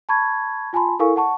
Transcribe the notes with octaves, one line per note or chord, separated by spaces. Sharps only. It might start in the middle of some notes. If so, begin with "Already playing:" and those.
A5 B5 C#6 G#6
F4 G#5 A5 B5 C6
E4 A4 A#4 F5 G#5 C#6
F#5 A5 C#6